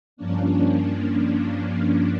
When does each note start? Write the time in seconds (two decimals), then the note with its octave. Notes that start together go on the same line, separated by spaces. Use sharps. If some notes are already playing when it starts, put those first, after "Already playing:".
0.17 G2 F3 A#3 C#4 D4